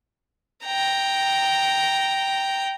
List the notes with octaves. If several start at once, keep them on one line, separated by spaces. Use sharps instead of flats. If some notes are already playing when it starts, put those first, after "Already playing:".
G5 A#5